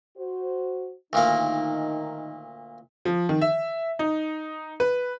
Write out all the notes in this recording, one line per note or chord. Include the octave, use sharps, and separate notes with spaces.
F#4 C5
D2 A#2 D#3 A#3 D#4
F3
D#3
E5
D#4
B4